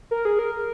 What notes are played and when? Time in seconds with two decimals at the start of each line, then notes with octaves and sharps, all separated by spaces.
0.11 A#4
0.25 G#4
0.39 A#4